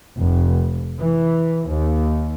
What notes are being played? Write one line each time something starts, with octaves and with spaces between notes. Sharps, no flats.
F1
E3
D#2